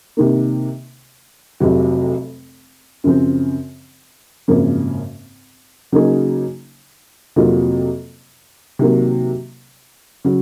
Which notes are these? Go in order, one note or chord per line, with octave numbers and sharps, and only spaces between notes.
C3 D#3 A#3
F1 F2 C3 F#3
F#2 C#3 F3 C4
G#1 F#2 C#3 F3 A#3
C#3 F#3 A#3 D#4 G#4
F2 C3 F#3 A#3 F4
C3 D#3 F#3 A#3
C#3 F#3